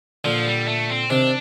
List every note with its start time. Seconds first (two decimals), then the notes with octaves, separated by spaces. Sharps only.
0.24 A#2 D3 F3
0.46 G3
0.68 A3
0.90 C4
1.10 C3 D#3 D4